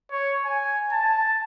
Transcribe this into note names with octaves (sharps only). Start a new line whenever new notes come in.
C#5
G#5
A5